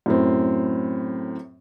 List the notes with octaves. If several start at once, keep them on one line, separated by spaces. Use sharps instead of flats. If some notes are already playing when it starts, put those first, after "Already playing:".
F#2 A2 C4